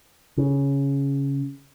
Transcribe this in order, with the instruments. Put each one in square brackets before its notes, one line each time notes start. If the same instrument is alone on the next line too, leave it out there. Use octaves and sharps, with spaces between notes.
[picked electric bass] C#3